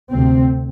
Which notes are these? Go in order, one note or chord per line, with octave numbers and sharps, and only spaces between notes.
D2 C3 C4